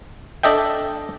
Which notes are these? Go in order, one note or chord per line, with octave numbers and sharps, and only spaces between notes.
D4 A4 D#5 E5 G5